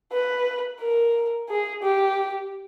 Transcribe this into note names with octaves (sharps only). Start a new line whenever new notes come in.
B4
A#4
G#4
G4